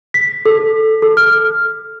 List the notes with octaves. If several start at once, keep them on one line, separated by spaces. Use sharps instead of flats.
B6
A4
A4
F6